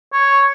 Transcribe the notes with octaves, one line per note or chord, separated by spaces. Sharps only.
C#5